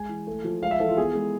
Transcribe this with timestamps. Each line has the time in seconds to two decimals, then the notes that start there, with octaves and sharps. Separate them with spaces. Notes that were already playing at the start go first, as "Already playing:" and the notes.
Already playing: G#3 G#5
0.09 E3
0.27 A3
0.44 F3
0.62 G#3 F5
0.71 E5
0.80 E3 A4
0.89 F4
0.97 B3 G#4
1.15 G#3